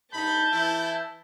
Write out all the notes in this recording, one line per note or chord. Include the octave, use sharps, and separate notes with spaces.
G2 D#4 A5 B5 G6
E3 E4